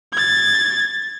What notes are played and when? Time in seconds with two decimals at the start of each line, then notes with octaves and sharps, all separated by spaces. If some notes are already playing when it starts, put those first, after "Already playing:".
0.13 G#6 A6